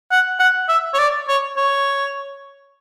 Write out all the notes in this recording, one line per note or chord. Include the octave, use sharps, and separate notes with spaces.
F#5
F#5
E5
C#5
D5
C#5
C#5